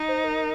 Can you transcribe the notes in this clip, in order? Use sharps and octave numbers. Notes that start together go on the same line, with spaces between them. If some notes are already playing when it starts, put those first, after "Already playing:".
Already playing: D#4
C5
A#4